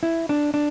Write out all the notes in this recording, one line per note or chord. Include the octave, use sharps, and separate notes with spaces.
E4
D4
D4